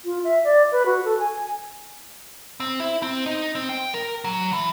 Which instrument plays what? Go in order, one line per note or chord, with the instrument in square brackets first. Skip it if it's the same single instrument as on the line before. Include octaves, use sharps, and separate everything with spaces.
[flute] F4
E5
D5
B4
F#4
A4
G#5
[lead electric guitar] C4
E4
C4
D#4
C4
G5
A#4
F#3
E3